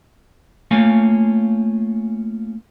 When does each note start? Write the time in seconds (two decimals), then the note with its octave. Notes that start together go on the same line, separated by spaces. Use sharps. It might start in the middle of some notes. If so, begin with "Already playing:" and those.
0.71 A3 A#3 C#4 F4 F5 G#5